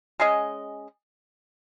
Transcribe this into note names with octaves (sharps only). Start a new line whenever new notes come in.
G#3 C#4 G#4 D#5